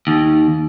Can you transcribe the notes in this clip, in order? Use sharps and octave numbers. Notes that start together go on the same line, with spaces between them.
D#2